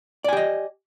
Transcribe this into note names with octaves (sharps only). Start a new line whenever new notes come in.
G4 D5 D#5 G#5